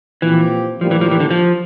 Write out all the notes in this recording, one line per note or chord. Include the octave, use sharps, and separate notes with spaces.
A#2 E3 F3 C4 G4
A2 F3 G3 A#3 D4 G4
E3
F3
E3
D3
F3